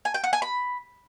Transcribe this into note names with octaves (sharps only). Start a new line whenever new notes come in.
G#5
G5
F#5
G#5
B5